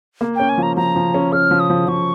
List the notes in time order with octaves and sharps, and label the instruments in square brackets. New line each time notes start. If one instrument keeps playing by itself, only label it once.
[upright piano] A#3
[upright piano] C#4 [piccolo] G5
[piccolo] G#5
[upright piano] F3 [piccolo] A#5
[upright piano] F3 [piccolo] A#5
[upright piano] F3
C#4
[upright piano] C#4 [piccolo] F6
[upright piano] F3
[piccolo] D#6
[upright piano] F3
[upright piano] F3 [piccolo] C#6